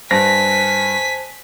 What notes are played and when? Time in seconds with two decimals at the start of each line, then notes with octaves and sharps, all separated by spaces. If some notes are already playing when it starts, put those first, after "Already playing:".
0.11 G2 C5 G#5 A5 A#6 B6